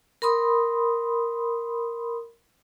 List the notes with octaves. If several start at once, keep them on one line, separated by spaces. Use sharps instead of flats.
A#4 B5 C6 D#6